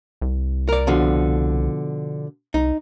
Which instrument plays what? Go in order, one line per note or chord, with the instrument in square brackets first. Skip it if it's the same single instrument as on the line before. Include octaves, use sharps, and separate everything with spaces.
[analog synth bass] C2
[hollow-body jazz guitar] A#4 D5
B2 D3 F3
[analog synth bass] C2 [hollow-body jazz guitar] D#4